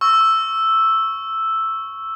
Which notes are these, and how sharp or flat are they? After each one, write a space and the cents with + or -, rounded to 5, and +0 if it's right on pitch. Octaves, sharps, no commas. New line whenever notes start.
C#6 +0 E6 +0